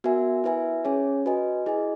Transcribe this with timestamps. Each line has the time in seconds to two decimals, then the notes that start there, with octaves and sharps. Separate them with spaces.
0.04 B3 F#4 A#4 E5 G#5
0.44 E4 B4 E5 G#5
0.84 C#4 G#4 C#5 G#5
1.26 F#4 B4 D#5 G#5
1.66 E4 G#4 D#5 G#5